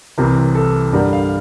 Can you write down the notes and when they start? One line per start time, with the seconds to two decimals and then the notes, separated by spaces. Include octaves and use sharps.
0.18 C2 C3 E3 A#4
0.55 A4
0.93 G2 D3 G3 A#4
1.13 F5